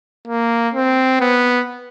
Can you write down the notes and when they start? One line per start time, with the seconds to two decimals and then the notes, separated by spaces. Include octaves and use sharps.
0.27 A#3
0.74 C4
1.20 B3